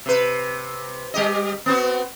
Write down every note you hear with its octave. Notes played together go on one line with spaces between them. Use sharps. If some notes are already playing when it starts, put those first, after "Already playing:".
C3 B4
G3 G4 D#5
B3 C4 F#4